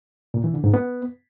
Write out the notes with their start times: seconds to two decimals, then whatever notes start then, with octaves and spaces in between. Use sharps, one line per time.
0.34 A#2
0.44 E3
0.54 D3
0.64 G#2
0.74 B3